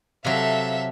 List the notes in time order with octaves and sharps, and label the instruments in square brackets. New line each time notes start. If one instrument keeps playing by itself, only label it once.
[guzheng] C3 F#3 [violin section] A4 E5 F5